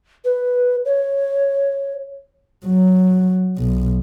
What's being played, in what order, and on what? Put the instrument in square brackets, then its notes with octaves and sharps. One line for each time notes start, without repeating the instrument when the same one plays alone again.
[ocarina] B4
C#5
[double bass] F#3
B1